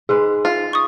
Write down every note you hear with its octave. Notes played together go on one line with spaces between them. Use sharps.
G#2 G#3 G#4 B4
F4
C#6 D#6